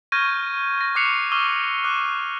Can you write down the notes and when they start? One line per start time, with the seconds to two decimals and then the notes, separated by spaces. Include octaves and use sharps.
0.12 C#6 F6 G6 G#6 A#6 D#7
0.81 A#6
0.95 C#6 D6 F#6 C7 C#7 F7
1.32 C#6 D6 E6 F6 D#7 G7
1.84 D6 F#6